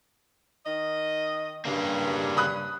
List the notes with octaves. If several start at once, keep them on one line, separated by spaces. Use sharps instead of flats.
D#3 D#5
G2 C#3 A#3
B5 D#6 F#6